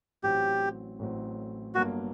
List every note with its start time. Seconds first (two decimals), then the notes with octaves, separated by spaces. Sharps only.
0.23 A1 A2 F#3 C4 G4
0.99 A1 A2 F#3 C4
1.75 G1 G2 F#3 A#3 F#4